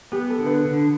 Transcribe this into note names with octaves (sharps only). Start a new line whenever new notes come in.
B3 G4
A4
D3
B4
D3